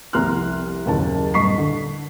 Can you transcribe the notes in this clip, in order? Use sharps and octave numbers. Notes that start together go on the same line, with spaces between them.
F1 C2 A#5 C6 F6 F#6
F#1 D#2 C#3 A5
D#1 G2 D#5 C#6 B6 C7
D3